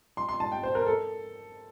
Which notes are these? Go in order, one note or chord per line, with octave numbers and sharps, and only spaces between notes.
C6
C6
A5
G5
C5
A#4
A4